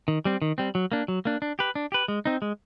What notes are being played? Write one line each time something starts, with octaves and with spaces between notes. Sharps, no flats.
D#3
G3 C4
D#3
G3 C4
F#3
A#3 D4
F#3
A#3 D4
D4
G4 B4
D4
G4 B4
G#3
C4 D#4
G#3